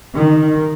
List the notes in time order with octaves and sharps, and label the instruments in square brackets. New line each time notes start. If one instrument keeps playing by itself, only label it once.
[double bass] D#3